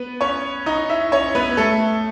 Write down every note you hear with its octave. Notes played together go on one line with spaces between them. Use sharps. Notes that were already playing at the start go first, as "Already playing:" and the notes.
Already playing: B3 B4
C#4 C#5
D#4 D#5
E4 E5
C#4 C#5
B3 B4
A3 A4